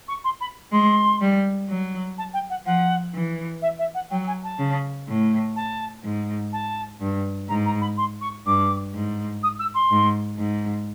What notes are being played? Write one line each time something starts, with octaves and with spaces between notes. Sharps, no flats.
C#6
C6
B5
G#3 C6
G3
F#3
A5
G5
F#5
F3 F#5
E3
E5
E5
F#5
F#3 G5
G#5
A5
C#3
A2
A5
G#2
A5
G2
G#2 A#5
A#5
B5
C6
C#6
G2 D6
G#2
D#6
E6
C6
G#2
G#2